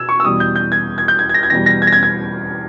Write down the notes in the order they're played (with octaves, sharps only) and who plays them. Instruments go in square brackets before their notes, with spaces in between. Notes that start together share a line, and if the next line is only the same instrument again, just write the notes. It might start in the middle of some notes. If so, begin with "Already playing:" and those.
Already playing: [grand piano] B2 E6 G#6
C#6
E6
E2 B2 G3 D#6
G6
G6
G#6
G#6
G6
G#6
G#6
A#6
G#6
E2 B2 G3 A#6
A#6
G#6
A#6
G#6
G#6